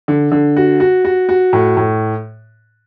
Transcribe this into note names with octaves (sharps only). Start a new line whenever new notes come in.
D3
D3
F#4
F#4
F#4
F#4
A2
A2